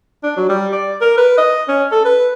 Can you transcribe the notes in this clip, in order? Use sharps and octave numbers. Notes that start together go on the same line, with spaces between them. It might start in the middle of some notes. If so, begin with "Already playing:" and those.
D4
F#3
G3
D5
A#4
B4
D#5
C#4
A4
B4